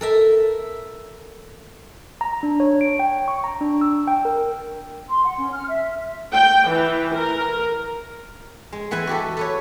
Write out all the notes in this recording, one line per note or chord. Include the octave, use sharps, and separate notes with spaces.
A4 A#4 E5
A#5
D4
C#5
D7
G5
C#6
A#5
D4
E6
G5
A#4
C6
F#5
C#4
F6
E5
G5
E3
A#4
G#3
E3 B3 B4 E5 G#5
F#4 G4 A4
A4 B4 C#5